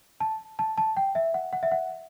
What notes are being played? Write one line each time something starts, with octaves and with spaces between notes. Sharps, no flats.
A5
A5
A5
G5
E5
F#5
F#5
E5
F#5